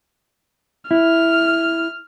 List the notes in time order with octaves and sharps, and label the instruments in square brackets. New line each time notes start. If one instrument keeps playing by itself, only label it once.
[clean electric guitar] E4 [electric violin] F6